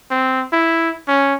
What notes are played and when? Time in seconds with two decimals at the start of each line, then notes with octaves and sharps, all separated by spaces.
0.11 C4
0.53 E4
1.08 C#4